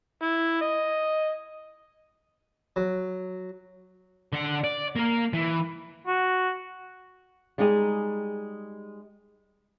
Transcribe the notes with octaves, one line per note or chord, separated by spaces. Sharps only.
E4
D#5
F#3
D3 F#5
D5
A#3 A#4
E3
F#4
G3 G#3 D#4 G4 G#4